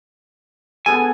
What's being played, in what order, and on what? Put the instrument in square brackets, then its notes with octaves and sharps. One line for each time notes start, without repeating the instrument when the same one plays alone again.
[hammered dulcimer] B3 G#4 A4 [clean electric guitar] G#5